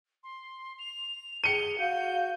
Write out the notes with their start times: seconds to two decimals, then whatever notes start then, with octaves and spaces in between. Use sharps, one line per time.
0.24 C6
0.79 F7
1.44 G#4 C#7 D#7 G7
1.79 F#4 F5 G6